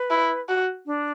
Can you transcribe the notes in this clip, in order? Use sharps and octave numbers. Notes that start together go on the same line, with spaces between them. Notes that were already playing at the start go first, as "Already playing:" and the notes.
Already playing: B4
E4
F#4
D4